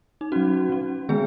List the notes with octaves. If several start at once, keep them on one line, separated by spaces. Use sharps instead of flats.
D#4
F#3 C#4 F#4
F#3 C#4
D#3 G#3 B3 G#4